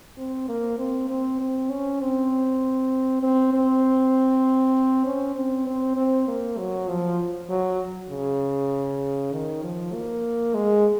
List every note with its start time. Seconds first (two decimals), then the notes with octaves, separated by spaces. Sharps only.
0.18 C4
0.49 A#3
0.79 C4
1.10 C4
1.40 C4
1.70 C#4
2.01 C4
3.23 C4
3.53 C4
5.06 C#4
5.36 C4
5.67 C4
5.97 C4
6.28 A#3
6.58 F#3
6.89 F3
7.50 F#3
8.10 C#3
9.32 D#3
9.62 F3
9.93 A#3
10.54 G#3